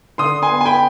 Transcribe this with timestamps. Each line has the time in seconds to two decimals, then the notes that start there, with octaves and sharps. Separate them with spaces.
0.18 D3 C6 D#6
0.42 G#5 C6
0.50 B3
0.61 G#5
0.66 G5 B5